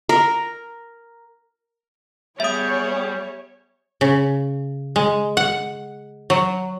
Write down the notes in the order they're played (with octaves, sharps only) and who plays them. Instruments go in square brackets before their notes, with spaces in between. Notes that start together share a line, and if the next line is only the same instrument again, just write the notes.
[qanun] A#4
[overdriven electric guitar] G3 [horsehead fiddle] B3 G#4 [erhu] C#5 [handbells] E5 D#6
[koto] C#3
G#3
F#5
F#3